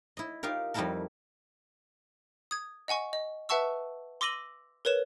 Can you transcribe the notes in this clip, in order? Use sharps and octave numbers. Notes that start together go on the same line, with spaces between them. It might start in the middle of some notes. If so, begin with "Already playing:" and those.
E4 D#5
D#4 F4 G4 A#4
F2 G3 D#4 E4 A4 A#4
D#6 G#6
D#5 F#5 G#5 C#6
D#5
B4 E5 F#5 A5 C#6 E6
C6 D6 E6 A#6 D#7 F#7
A#4 B4 C#5 E7